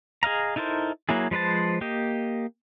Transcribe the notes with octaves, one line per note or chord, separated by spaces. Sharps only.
G#4 D#5 F5 A#5
D#4 E4 A4 A#4 C5
F#3 A#3 E4 G#4
F3 G#3 B4 C5 A5
A#3 G4 D#5